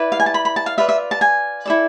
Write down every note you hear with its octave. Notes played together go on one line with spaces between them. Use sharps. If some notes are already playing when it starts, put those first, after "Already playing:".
Already playing: E4 B4 D5
F5
G#5
A5
B5
B5
A5
F5
F4 B4 D5 E5
E5
A5
G#5
E4 A4 D5